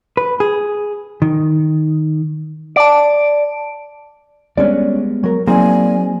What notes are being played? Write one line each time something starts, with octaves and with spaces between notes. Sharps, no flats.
B4
G#4
D#3
D5 A5 D7
G3 G#3 B3 C#4 D4 D5
F#3 A#4
F#3 A#3 C4 D#4 G#4 D5 G#5